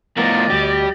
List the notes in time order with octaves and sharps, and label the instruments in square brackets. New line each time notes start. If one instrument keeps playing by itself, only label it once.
[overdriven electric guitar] A2 A#4 [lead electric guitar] F3 [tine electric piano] B3 [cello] D5 D#5
[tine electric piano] D2 F#4 [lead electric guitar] G3 [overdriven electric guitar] G4